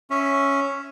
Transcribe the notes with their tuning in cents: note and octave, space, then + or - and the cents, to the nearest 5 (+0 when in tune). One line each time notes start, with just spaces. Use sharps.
C#4 +0 E5 +0